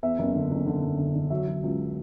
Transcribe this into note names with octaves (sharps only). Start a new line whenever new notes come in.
E2 E5
F#1
D3
F#1
D3
F#1
D3
D3
F#3 E5
F#3
C#2